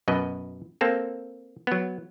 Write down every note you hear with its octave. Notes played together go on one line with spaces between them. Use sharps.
F#2 B2 B4 D#5
A#3 C4 A4
F#3 B3